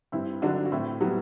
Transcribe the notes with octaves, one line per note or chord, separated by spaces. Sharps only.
G2 C4 E4
D3 F#3 D4 F#4
F#4
A2 C4 E4
F#3 G3 B3